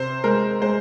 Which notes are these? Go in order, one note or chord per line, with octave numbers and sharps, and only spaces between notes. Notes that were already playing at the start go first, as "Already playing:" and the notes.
Already playing: C3 C5
G#3 A#4
G#3 C5